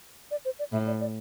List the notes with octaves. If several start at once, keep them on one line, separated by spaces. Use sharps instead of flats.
D5
C5
D5
A2 E5
D5
D5